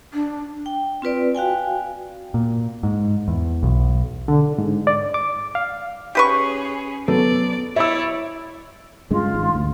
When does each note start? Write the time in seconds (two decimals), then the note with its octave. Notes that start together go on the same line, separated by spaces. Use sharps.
0.13 D4
0.66 G5
1.02 C4 F4 B4 D5
1.35 F#4 F5 G5 G#5
2.34 A#2
2.83 G#2
3.28 E2
3.63 B1
4.28 D3
4.58 G#2
4.87 D5
5.14 D6
5.55 F5
6.15 C#4 G4 G#4 B4 C#6
7.08 F#3 B3 A4 D5
7.76 E4 C#5 D5 E5 E6
9.11 G2 C#3 G#3 F4
9.34 G#1 G#2
9.55 D2